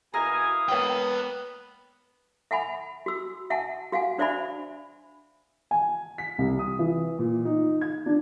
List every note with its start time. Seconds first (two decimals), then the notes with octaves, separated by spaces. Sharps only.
0.14 B2 E4 A#4 F5 G#5 D#6
0.69 A#3 B3 B4 C#5 F#5 G5
2.51 E5 F#5 G#5 B5
3.06 F#4 E6
3.50 E5 F#5 G#5 A5
3.92 F#4 F5 F#5 G#5
4.18 D4 C5 D5 E5 G#5 B5
5.71 G#5
6.18 B6
6.38 C2
6.59 D#6
6.79 E3
7.19 A#2
7.45 D#4
7.81 G#6
8.06 D4